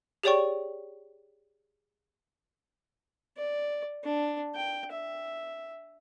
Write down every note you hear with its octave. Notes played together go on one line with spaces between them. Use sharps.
G4 G#4 C#5 D5 G5 C#6
D5
D4
G5
E5